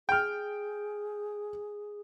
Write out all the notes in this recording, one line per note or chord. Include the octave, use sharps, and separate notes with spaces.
G#4 G5 F6